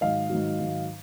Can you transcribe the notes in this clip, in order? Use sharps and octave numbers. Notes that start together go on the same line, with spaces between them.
G#2 D#3 F#3 D#5 F5
G#2 D#3 F#3
G#2 D#3 F#3